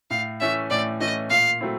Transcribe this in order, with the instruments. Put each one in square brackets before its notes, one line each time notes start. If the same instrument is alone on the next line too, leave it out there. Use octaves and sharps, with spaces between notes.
[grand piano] A2 [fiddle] F5
[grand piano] E3 A3 C#4 [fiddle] E5
[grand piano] A2 [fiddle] D5
[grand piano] E3 A3 C#4 [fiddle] D#5
[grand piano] A#2 [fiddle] F5
[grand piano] F#3 A3 C4 E4